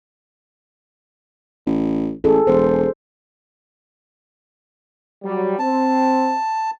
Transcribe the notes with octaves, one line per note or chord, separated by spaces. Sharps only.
A1
A1 G#4 A4
E1 C5
F#3 G3
C4 A5